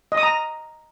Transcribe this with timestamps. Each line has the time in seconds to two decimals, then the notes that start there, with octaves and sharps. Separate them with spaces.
0.12 D#5
0.17 D#6
0.23 A#5